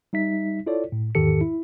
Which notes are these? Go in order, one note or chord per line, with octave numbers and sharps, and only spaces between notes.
G3 D#4 E5 B6
E4 F4 A4 C#5 D5
A2
E2 G#2 D#3 G4 A4 C#7
E4